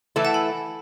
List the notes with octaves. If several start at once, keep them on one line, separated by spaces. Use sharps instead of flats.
E3 A3 E4
F#5 A5
G#5 B5